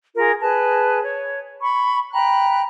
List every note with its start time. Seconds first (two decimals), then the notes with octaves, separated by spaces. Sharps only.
0.16 F4 G#4 A#4
0.41 G#4 B4 A5
1.03 C#5
1.61 B5 C#6
2.13 G5 A#5 B5 F#6